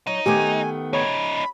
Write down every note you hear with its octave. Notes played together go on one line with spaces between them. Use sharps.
F#3 D#4
D#3 A3 B3 G4 G#5
C#4 D#4 C#5 B5